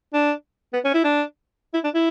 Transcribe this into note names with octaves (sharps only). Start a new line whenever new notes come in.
D4
B3
C#4
E4
D4
E4
D4
E4